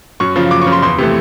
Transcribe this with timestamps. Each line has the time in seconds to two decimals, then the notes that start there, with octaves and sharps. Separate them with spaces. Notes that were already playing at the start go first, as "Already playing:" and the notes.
0.20 F#2 C#6
0.36 C#3 F3
0.51 F#2 D6
0.62 C#6
0.67 C#3 F3
0.72 C6
0.82 E2 C6
0.98 C3 E3 A3